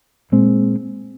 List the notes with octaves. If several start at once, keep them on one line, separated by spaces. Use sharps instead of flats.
A#2 G#3 C4